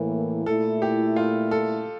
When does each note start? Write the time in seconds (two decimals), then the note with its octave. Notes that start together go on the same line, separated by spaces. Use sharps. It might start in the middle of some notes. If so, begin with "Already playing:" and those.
Already playing: A2 E3 A#3
0.46 A#2 A3 E4 A4
0.82 G4
1.16 F4
1.51 A4